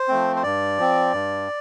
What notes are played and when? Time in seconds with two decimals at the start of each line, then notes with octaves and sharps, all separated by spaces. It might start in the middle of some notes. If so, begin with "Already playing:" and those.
Already playing: C5
0.08 F3 A3 C4
0.36 C5
0.43 G2 D5
0.78 F3 C4
1.13 G2